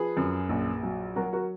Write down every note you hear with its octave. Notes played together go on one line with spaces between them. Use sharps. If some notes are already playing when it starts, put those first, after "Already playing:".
Already playing: F3 G#4 B4
F#2
A#1
F#3
F#3 F#4 A#4
F#4 A#4